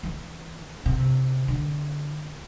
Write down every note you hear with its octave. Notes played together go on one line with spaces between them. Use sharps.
E3
C3
D3